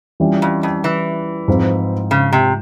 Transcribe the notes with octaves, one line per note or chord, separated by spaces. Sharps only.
E3 G3 C#4 F4
F2
F2
E3
G#2 F3 G#3 C4 F4
C#3
C3